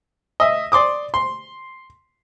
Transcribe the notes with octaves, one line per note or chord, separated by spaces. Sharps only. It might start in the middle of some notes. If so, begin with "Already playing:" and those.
D#5 E5
D5 C6 D6 D#6
C6